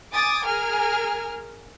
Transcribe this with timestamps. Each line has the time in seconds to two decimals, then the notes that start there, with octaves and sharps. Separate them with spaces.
0.14 G#5 D6 D#6 A6
0.47 G#4 A#4 G#5 F6